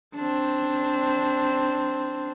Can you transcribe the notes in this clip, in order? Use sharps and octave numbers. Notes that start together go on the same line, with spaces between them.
C4 D4